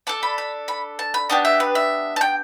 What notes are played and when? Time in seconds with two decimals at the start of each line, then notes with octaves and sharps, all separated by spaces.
0.07 D4 A4 A5
0.23 B5
0.38 B5
0.68 B5
0.99 A5
1.14 B5
1.30 B3 D4 G4 A5
1.45 E5
1.60 B4
1.75 E5
2.16 A5
2.21 G5